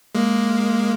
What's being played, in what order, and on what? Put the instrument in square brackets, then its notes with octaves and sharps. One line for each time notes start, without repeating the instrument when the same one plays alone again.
[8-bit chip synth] G#3 A#3